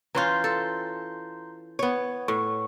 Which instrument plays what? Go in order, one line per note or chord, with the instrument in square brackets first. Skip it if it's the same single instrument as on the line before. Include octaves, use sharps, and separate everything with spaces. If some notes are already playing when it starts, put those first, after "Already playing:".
[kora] E3 C#4 F4 [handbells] A#5 C6 G6
[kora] A4
B3 C#5
[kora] A2 [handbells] C#6